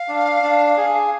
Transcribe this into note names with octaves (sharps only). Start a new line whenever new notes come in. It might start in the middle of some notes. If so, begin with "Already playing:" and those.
Already playing: F5
D4
D4
G#4